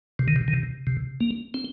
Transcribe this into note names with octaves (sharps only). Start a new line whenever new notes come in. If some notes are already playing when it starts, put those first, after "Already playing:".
C3
D#3
C3
D#3
C3
C3
A#3
C4